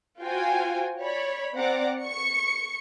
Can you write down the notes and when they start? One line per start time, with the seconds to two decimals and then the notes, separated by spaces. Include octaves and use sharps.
0.20 F4 F#4 C5 G5 G#5
0.99 C#5 D5 B5
1.54 C4 D5 F#5 A#5 D6
2.01 C#6 C#7